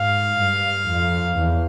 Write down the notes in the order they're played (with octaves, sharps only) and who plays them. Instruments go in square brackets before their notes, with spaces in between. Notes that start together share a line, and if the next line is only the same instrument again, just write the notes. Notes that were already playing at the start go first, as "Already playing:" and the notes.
Already playing: [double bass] G#2 [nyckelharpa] F5
[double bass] G2
F2
E2